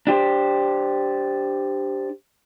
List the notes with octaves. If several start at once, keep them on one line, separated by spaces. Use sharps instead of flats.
D4 G4 C5